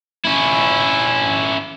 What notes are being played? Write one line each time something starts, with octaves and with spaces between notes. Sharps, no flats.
C#4 E4